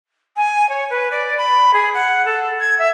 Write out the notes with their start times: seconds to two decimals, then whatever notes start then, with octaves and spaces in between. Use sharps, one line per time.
0.36 G#5
0.69 C#5
0.90 B4
1.11 D5
1.37 B5
1.73 G#4
1.94 F#5
2.25 A4
2.60 G#6
2.79 E5